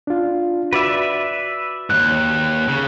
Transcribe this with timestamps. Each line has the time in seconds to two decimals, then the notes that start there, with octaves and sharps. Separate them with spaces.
0.07 D4 F4
0.73 F#4 B4 D5 E5
1.90 D#2 G#2 F#6
2.68 C#3